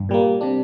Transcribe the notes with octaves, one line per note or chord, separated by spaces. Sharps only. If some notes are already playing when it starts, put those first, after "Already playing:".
Already playing: G2
A#2 G3 A#3
C3 G3 D4